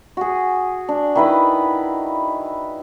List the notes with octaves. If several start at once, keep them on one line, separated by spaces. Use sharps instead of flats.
F#4 G#4
D4
D#3 E4 B4